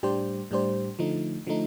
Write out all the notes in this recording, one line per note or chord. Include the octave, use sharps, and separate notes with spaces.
A2 G3 D4 G4 C5
A2 G3 D4 G4 C5
D3 F3 A3 D#4
D3 F3 A3 D#4